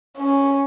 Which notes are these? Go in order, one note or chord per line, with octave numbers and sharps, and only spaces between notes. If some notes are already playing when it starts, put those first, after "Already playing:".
C#4